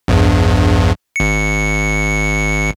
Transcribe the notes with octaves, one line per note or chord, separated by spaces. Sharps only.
A#1 E2 G2
G#1 C#7